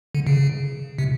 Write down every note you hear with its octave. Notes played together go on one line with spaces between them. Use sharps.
D3
C#3
C3